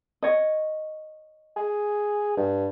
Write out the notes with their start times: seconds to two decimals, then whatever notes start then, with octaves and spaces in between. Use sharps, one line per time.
0.23 C#5 D#5
1.56 G#4
2.37 G2